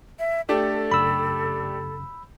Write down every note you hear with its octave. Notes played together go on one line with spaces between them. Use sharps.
E5
A3 D4 G4 A4
F#2 C#3 B5 E6